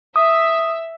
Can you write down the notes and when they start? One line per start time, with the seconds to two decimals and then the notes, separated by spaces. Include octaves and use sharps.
0.16 E5 D#6